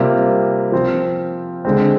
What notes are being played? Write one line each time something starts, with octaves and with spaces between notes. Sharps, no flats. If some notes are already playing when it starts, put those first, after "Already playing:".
Already playing: C3 G3 A#3 F4
F3 C4 F4
D3 G#3 C4